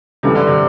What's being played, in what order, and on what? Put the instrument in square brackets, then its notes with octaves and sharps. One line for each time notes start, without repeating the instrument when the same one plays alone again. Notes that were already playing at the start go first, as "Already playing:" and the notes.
[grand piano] G2 E3 A3 [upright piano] C3
[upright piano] D3
C3